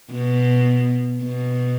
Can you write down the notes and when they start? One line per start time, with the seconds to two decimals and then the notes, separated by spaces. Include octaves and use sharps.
0.12 B2
1.24 B2